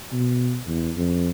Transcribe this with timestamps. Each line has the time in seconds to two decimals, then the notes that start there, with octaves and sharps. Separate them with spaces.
0.12 B2
0.67 E2
0.97 F2